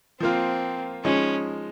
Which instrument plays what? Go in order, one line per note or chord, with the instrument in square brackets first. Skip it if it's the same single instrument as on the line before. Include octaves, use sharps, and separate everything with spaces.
[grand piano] F3 A#3 F4 [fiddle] C4
[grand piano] F3 G#3 D#4 [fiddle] C#4